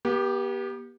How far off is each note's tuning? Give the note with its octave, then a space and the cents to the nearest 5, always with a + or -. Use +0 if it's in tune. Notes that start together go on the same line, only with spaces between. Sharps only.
B3 -45 G4 +0